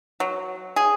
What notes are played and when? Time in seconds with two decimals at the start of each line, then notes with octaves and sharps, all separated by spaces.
0.20 F#3
0.76 G#4